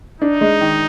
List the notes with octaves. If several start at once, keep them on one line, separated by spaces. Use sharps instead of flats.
D4 D#4
G#3
D#3